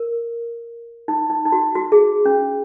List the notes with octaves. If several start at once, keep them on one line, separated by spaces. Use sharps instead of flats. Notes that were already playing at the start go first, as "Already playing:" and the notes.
Already playing: A#4
D#4
D#4
D#4
F#4
F#4
G#4
C#4